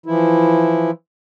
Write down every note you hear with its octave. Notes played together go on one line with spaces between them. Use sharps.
E3 F3 E4